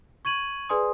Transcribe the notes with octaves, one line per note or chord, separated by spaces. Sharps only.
C#6 G#6 D#7 F#7
G#4 B4 D5 G#5 C6 D#6